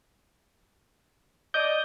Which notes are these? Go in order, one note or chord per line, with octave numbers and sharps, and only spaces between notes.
D5 D#5 G6